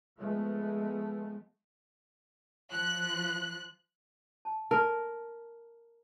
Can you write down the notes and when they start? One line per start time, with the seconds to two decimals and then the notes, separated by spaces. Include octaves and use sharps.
0.18 F3 G#3 A3 B3
2.72 F3 F#6
4.45 A5
4.71 A#4 A5